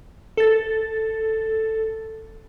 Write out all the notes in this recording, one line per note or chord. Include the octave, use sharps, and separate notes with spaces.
A4 A6